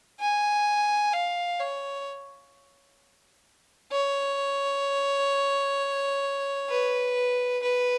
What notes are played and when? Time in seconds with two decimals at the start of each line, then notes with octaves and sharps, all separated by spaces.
0.20 G#5
1.13 F5
1.60 C#5
3.92 C#5
6.69 B4
7.62 B4